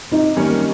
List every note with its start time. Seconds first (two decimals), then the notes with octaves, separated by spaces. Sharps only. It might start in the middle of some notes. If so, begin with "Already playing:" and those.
0.11 C3 D#4
0.36 D#3 G3 A#3 C#4